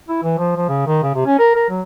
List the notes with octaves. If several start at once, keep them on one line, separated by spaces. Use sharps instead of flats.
E4
E3
F3
F3
C#3
D#3
C#3
C3
C#4
A#4
A#4
F#3